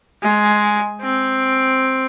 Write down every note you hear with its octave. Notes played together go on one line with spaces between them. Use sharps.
G#3
C4